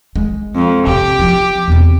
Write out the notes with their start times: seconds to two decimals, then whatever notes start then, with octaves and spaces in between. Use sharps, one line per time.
0.16 G#3
0.56 F2
0.87 C3 G4
1.19 F3
1.68 E2 C3